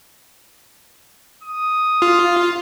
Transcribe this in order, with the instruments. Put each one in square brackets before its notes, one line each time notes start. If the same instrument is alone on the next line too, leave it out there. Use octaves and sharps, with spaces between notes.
[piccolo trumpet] D#6
[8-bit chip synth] F4